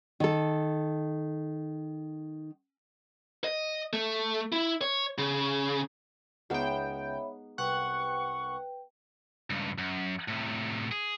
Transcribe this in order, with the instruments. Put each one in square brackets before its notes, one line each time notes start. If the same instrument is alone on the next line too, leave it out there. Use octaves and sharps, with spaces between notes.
[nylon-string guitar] D#3 A4
[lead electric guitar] D#5
A3
E4
C#5
C#3
[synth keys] C#2 G5 [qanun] G#3 B3 D#4 [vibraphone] C#5 E5 B5
[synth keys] C2 F#5 [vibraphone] B4 G5 [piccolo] C#6
[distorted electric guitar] C#2 G2
F#2
A2 C3
G#4